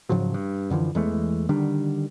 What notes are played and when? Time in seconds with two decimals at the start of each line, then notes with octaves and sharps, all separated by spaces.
0.09 G#2 C#3 F3 F#3
0.34 G2
0.70 F#2 D3 E3 F3
0.95 E2 E3 G#3 A3
1.49 D3 D#3 G3 D4